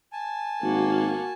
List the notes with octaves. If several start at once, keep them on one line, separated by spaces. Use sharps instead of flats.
G#5 A5
G#1 A#3 F#4